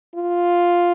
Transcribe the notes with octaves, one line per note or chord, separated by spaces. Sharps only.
F4